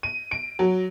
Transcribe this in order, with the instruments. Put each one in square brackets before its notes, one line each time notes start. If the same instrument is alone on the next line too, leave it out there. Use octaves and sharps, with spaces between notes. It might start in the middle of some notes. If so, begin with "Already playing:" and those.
[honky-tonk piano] D#7
D7
F#3